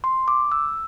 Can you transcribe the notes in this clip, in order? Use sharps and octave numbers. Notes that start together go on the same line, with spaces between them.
C6
D6
E6